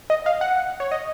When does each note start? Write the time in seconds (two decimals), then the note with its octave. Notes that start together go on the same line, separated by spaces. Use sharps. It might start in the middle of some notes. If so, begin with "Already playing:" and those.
0.10 D#5
0.26 F5
0.41 F#5
0.80 C#5
0.92 D#5